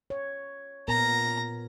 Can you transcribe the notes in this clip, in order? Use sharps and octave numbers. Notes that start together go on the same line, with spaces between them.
C#5
A#2 B3 A#4 A#5